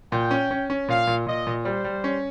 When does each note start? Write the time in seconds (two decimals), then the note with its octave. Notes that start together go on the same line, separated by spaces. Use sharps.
0.12 A#2 G5
0.31 C#4
0.51 C#4
0.70 C#4
0.88 A#2 F5
1.07 A#2
1.27 A#2 D#5
1.47 A#2
1.65 G3 C5
1.84 G3
2.04 C#4